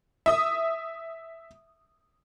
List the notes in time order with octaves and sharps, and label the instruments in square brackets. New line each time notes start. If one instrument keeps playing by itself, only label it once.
[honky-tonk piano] E5 D#6